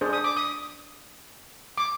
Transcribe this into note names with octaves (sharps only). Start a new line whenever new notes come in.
D4 G#4 C5
D#6
D6
D#6
D6